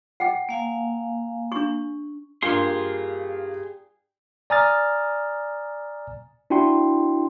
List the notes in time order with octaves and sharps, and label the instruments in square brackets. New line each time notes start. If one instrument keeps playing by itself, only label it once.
[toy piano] F#5 G5
[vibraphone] A#3 F5 G#5
[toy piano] D4 C#6
[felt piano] G2 A#3 F4 [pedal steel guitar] G4 G#4 C6
[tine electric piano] D5 G#5 A#5 D#6 F6 A6
D4 E4 F#4 G5 C6